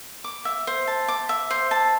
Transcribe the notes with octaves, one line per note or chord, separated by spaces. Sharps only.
D6
E5
C5
A5
D6
E5
C5
A5